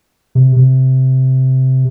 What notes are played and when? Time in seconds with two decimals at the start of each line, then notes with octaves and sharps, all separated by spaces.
0.35 C3
0.56 C3